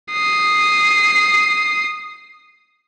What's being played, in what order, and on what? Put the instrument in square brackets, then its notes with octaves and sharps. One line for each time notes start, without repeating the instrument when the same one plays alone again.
[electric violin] D#6 C7